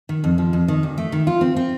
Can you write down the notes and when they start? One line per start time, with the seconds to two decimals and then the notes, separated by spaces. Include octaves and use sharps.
0.09 D#3
0.24 F2
0.38 F3
0.53 F2
0.68 D#3
0.83 D2
0.98 A3
1.12 D#3
1.27 F4
1.41 C4
1.56 C4